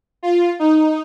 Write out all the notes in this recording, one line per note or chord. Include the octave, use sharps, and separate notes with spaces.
F4
D#4